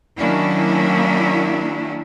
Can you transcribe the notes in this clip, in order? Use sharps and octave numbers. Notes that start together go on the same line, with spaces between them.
D#3 F#3 A#3 C#4 D4 E4